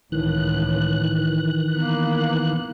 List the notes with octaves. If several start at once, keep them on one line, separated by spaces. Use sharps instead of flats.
C#2 A2 D#3 E3 F#6
A#3 B3